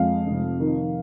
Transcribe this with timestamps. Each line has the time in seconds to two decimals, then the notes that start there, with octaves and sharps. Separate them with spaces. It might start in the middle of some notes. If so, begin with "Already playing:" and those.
Already playing: F2 G#3 F5
0.27 F1
0.60 D#3